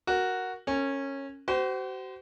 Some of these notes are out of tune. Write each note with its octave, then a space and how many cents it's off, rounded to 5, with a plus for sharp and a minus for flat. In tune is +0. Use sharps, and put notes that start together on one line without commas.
F#4 +0 A#4 +0
C#4 -15 A#4 -35
F#4 +40 C5 -25